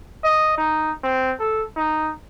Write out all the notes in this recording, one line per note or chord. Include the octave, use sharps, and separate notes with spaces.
D#5
D#4
C4
A4
D#4